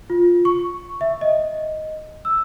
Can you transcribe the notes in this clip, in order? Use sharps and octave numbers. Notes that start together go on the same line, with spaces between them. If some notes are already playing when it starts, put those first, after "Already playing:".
F4
C#6
E5
D#5
E6